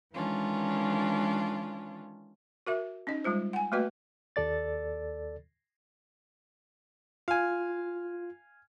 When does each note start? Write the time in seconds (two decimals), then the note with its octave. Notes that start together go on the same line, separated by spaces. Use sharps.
0.14 D#3 E3 G#3 C#4 D4 F4
2.67 F#4 A#4 E5
3.07 C#4 D#4 D#5
3.24 G3 G#3 F4 C5
3.53 F#5 G#5
3.72 A3 A#3 F#4 B4 D#5
4.36 D#2 A4 D5 A6
7.28 F4 F5 G#5